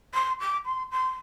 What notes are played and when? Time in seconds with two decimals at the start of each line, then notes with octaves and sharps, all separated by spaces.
0.14 C6
0.39 D6
0.65 C6
0.91 C6